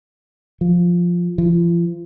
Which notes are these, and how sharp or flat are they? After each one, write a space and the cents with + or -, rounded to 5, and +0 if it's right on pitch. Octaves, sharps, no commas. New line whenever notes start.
F3 +5
F3 -40